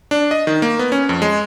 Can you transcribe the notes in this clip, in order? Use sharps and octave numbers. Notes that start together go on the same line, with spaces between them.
D4
D#5
D#3
A#3
B3
C#4
F2
G#3